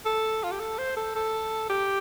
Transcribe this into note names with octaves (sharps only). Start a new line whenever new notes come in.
A4
F4
G4
A4
C5
A4
A4
G4